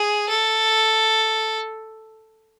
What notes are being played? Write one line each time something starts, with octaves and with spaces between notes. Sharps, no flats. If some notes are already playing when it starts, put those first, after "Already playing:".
Already playing: G#4
A4